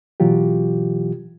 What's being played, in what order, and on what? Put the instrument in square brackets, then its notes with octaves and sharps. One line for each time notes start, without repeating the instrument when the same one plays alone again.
[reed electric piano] B2 E3 F#3 F4 G4